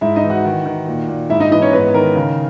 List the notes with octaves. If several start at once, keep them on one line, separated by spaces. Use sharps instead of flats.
G#2 E4 E5
D#4 D#5
E3
F#4 F#5
D#3
D#3
A#2
A#2
G#2 E4 E5
D#4 D#5
E3 D#4 D#5
C#4 C#5
G#2 B3 B4
D#3 A#4
C#3